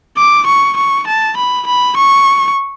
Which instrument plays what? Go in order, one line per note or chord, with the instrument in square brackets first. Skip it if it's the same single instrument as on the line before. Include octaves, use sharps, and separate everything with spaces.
[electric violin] D6
C#6
C#6
A5
B5
B5
C#6